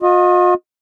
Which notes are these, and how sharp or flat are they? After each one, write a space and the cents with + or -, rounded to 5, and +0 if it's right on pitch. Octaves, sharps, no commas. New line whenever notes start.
F4 +45 D#5 +0